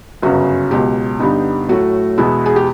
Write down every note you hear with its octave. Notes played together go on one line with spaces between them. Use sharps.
G1 F#2 C#3 F#4
C#2 B2 F#3 G4
G2 D3 G3 B3 D#4
A2 F#3 A3 F#4
E2 B2 G#3 B3 E4
G#4
G4